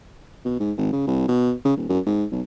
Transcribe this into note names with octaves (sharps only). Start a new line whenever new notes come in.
B2
G#2
G#1
C#3
C2
B2
C#3
D#1
F#2
G#2
B1